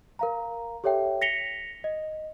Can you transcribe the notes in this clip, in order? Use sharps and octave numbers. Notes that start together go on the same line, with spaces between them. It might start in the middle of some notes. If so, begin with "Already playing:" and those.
A#4 F5 A#5
G4 A4 C#5 E5 G5
A#6 B6 C#7 F7 G7
D#5